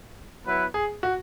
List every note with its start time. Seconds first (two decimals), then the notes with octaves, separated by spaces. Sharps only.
0.45 F#3 B3 E4 B4
0.74 G#4
1.03 F#4